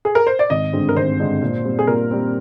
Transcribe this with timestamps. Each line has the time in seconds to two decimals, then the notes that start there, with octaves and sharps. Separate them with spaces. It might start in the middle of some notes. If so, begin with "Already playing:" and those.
0.05 G#4
0.15 A#4
0.27 C5
0.39 D5
0.50 G#1 D#5
0.73 G2 D3 G#3 C4
0.89 A#4
0.96 G#1 C5
1.19 G2 D3 G#3 C4
1.42 A#2
1.65 G3 C4
1.79 G#4
1.87 A#2 A#4
2.11 G3 C4